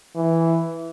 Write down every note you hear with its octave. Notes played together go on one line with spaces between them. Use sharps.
E3